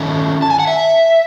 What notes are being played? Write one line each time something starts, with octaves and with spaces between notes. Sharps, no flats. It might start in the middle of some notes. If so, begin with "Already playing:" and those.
Already playing: D#3 A3 C#4 F#5
A5
G#5
F#5
E5